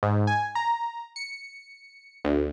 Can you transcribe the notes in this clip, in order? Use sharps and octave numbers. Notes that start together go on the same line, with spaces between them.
G#2
G#5
A#5
C#7
D2